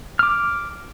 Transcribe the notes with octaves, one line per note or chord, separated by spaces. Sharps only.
D6 F6